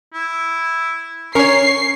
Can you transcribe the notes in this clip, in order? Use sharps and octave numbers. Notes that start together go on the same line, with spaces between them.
E4
C#4 A#4 C#5 C#6 C7